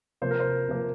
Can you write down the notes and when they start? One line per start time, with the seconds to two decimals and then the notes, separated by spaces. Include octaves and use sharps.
0.21 C3 F3 A#3 C5
0.31 A#4
0.40 C5
0.69 C3 F3 A#3